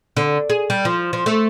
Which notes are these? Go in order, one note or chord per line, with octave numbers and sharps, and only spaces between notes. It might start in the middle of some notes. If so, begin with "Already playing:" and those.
D3
G#4
G3
F3
F3
A3